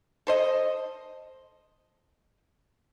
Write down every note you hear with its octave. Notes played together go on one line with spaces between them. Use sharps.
A4 C5 D#5